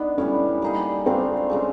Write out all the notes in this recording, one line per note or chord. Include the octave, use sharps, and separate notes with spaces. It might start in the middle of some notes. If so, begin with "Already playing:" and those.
Already playing: B3 D4 D#4
A2 E3 G3 C#4
G3 A#3 D#4 G#4
A3 C4 D4 F4 A#4
C#3 F3 G#3